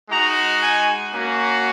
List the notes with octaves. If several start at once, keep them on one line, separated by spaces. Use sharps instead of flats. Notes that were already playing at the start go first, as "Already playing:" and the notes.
G#3 D#4 F#4 A#5
G#5
A#3 C#4 F#4